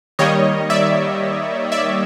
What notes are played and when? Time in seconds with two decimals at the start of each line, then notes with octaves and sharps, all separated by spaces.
0.19 D#3 G3 A#3 C#5 D#5
0.70 D5 E5
1.72 D5 E5